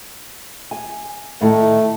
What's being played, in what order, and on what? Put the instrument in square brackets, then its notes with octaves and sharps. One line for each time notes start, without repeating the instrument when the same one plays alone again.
[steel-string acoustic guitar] G#5
[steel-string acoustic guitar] A2 D#3 [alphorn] A3